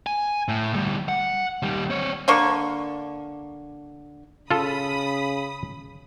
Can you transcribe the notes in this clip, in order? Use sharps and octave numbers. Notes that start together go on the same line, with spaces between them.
G#5
A2
D2 G3
F#5
D#2 G3
C4 C#5
D3 A#3 D4 C#6
C#3 F4 A4 B5 D#6